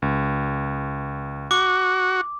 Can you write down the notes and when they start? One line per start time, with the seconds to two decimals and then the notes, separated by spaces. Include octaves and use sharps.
0.02 C#2
1.51 F#4 D6